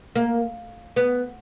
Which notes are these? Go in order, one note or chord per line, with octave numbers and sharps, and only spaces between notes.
A#3
B3